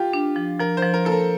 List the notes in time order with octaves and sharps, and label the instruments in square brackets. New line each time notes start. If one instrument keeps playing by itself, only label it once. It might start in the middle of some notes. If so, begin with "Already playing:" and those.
Already playing: [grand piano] F4 G4
[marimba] D4
F3
[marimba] F3 [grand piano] A#4
[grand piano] C5
[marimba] F3
[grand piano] A#4
[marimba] A#3 [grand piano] A4
[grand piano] A#4